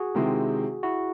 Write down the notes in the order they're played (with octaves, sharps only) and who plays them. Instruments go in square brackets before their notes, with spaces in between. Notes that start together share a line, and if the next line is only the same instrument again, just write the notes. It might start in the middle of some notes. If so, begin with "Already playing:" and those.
Already playing: [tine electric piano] F#4 G#4
[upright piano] C3 D#3 G#3 C4 E4
[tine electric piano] E4 F#4